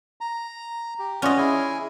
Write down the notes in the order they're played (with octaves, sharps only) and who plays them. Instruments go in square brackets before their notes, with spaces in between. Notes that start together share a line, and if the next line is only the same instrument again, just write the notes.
[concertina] A#5
G4
[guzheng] C#4 D#5 [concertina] F4 D5 F#5
[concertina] E4 G#4 G#5